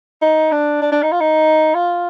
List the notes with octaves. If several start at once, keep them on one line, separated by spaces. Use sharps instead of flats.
D#4
D4
D4
D4
D#4
F4
D#4
F4